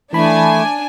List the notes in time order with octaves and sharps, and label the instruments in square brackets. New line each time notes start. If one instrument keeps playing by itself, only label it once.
[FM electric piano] E3 B5 [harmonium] A3 [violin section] D4 G#5